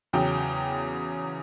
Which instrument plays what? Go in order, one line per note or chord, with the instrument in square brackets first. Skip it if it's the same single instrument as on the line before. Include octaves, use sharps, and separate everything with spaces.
[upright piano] E2 C#3 F#3 G5